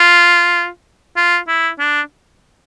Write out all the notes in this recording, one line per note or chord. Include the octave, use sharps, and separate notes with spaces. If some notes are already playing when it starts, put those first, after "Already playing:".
Already playing: F4
F4
E4
D4